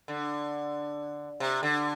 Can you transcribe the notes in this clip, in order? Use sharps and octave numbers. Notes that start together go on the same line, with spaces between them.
D3
C3
D3